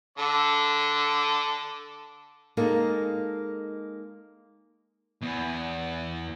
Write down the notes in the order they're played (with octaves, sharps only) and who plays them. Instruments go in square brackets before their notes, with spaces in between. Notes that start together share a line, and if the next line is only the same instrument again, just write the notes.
[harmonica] D3 A4 D5
[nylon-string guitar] G#3 A#3 D#4 G#4 A4
[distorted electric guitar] E2